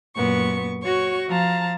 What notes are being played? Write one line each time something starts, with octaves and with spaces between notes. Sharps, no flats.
F#2 A#2 B3 C#6
F#4 C#5 C#6
F3 F5 A5 A#5